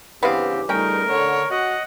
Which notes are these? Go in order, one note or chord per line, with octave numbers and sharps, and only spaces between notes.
G2 C#3 E3 B3 C4 G4 F5
C#2 G3 A3 C#4 D#4 A#4 G5
D3 C#5
F#4 D#5 F#5